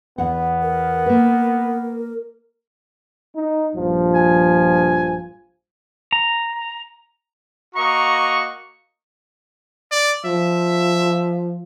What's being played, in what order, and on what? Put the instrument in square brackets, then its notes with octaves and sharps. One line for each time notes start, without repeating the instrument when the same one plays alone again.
[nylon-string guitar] E2 F#5 [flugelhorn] B3
[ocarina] A#4
[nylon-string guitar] A#3 B4
[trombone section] D#4
A#1 G2 F3
[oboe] G#5
[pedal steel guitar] A#5
[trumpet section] A#3 F#4 D#5 A#5 C#6
[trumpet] D5
[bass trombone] F3 [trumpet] E5